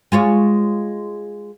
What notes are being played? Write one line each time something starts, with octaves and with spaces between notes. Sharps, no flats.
G#3 F4 C#5